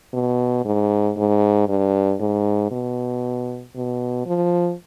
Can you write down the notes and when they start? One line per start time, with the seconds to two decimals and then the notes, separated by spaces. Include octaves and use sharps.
0.14 B2
0.65 G#2
1.17 G#2
1.68 G2
2.20 G#2
2.71 B2
3.75 B2
4.26 F3